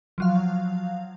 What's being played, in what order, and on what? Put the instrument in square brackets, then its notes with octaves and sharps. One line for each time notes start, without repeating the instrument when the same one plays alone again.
[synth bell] F3 F#3 F5